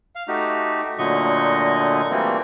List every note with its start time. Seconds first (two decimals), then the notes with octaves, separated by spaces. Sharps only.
0.15 F5
0.28 A3 D#4 F#4 G4
0.99 A#2 D3 F#3 A3 D#5 C#6
2.11 E3 G3 A3 A#3 C4